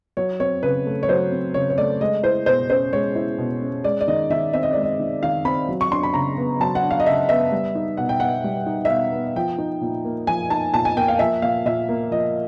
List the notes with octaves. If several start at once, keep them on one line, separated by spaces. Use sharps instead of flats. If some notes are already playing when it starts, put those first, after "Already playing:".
F#3 C#5
C4 C#5
C#3 B4
A3
C#5
F#3 C5
C4
C#3 C#5
C#5
A3 D5
G#3 D#5
E4 C5
B2 C5
C#4 C5
G#3 C#5
E4
B2
C#4
G#3 D5
D5
D#3 D#5
D#3 E5
C4 E5
D#5
G#3 D5
D#5
D#3
D#3 F5
C4 B5
F#3
C#6
D4 C6
B5
C#3 A#5
B3
F#3 A5
F#5
D4
F5
D#5
C#3 E5
B3 E5
G3
D#4
B2 F#5
G5
B3 F#5
G3
D#4
E5
B2 F5
B3
F3 G5
D#4
A#2
A#3
F3 G#5
D#4 A5
A#2 A5
G#5
A#3 G5
F5
F3 E5
A#2 F5
A#2 E5
A#3
F3 D#5